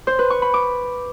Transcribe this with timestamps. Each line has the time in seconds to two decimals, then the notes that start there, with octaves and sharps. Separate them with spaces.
0.07 C5
0.19 B4
0.30 C#6
0.42 B5
0.54 D6